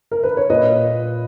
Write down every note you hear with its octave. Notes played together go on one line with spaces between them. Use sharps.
A#4
B4
C#5
A#2 B4 D#5